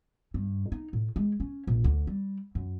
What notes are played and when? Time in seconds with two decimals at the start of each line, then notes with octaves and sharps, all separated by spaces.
0.34 G2
0.72 D#4
0.93 A2
1.16 G#3
1.40 C#4
1.67 A#1
1.84 D2
2.07 G3
2.55 F#2